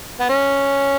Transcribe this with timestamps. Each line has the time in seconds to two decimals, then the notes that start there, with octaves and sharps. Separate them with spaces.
0.20 B3
0.29 C#4